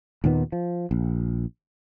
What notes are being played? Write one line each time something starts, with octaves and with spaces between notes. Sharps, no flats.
D#2 A#2 D#3 B3
F3
A#1